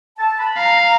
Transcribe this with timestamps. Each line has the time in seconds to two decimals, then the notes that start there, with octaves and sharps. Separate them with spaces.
0.18 A5
0.38 B5
0.58 F5 A#5
0.76 A#5